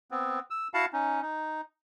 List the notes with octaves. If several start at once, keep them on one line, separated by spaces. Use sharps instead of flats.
B3 C4
E6
E4 F#4 F5 F#5 A5
C#4 D#4
D#4